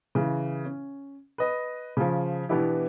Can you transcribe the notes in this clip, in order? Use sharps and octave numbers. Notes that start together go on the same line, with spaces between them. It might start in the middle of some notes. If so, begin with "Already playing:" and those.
C#3 E3
C#4
B4 D#5
C#3 F3
B2 E3 B3 D4 E4 G4